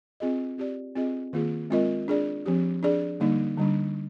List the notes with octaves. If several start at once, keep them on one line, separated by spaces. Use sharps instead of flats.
C4 F4 G#4 D#5
C4 G4 D5
C4 F4 G#4 D#5
D#3 A#3 F4 G#4
G#3 C4 F4 A#4 D#5
D4 G#4 D5
F3 C4 G4
D4 G#4 D5
D3 G3 A#3 D#4
D3 G3 D4